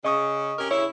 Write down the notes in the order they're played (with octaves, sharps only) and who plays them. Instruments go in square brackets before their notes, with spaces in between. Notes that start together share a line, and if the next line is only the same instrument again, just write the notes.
[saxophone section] C#3 [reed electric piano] D#5 C#6 D#6
[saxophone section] C#4 G4 A#4
[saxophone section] C#3 E4 [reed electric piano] C#5